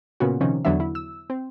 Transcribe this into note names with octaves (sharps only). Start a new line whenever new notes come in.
A#2 C#3 B3 C#4 F#4
C3 D#3 F3 C#4
E2 D3 F#3 B3 D4 E5
E4
E6
C4